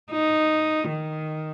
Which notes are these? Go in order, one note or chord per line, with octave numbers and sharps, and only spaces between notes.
D#4
D#3